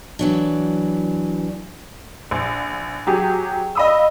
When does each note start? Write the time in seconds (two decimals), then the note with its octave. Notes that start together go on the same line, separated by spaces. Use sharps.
0.19 E3 F#3 D4
2.31 A#1
3.07 F#3 G4 G#4
3.75 D#5 F5 B5 D#6 E6